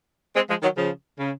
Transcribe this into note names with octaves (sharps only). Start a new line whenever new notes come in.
G#3 C4
F3 G#3
D#3 F#3
C#3 F3
C#3